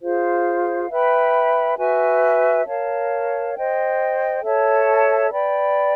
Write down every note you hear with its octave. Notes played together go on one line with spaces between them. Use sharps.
F4 G#4 C5 F5
B4 E5 G5 B5
F#4 B4 E5 G#5
A#4 C#5 F5 A5
C5 D#5 G5
A4 C#5 E5 A5
B4 D5 G5 B5